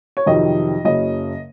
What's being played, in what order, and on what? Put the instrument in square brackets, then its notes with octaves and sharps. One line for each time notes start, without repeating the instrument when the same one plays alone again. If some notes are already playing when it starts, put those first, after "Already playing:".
[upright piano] C#5
F2 C3 D#3 F#3 D#5
F#1 F#2 C#3 D#5